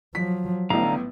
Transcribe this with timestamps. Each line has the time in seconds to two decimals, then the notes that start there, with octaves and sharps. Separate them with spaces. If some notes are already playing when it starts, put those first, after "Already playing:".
0.15 F3 F#3 B6
0.70 A1 A2 D3 B3 F5 A#5